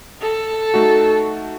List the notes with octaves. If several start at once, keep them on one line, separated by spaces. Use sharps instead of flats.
A4
A3 D#4 F#4